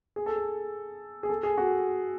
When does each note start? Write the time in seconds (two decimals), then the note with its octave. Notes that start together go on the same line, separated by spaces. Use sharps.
0.16 G#4
0.26 A4
0.36 G#4
1.23 G#4
1.29 A4
1.43 G#4
1.58 F#4